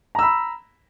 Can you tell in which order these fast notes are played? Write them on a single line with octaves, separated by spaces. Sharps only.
A#5 E6 B5